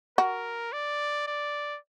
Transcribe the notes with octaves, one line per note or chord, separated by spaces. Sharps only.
F#4 A#4
D5
D5